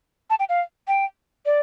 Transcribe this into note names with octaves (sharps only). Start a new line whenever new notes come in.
A5
G5
F5
G5
D5